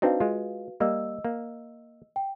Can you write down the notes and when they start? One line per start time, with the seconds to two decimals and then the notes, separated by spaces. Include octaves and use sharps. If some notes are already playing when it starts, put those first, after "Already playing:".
0.02 C4 D4 D#4 F#4 B4 F5
0.20 G#3 F4
0.80 G3 A#3 D#5 E6
1.24 A#3
2.16 G5